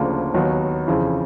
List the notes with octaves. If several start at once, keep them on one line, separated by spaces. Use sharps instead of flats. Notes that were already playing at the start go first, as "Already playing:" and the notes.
Already playing: D2 C#3 F3 A#3 D4
D#2 D#3 F#3 B3
F2 C#3 E3